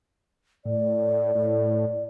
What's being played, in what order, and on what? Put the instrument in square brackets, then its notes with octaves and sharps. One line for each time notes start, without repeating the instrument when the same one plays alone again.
[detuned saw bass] A2 [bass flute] D5
[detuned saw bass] A2